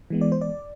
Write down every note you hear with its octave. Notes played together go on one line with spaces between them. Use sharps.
E3 G#3 B3
D5
C5
D5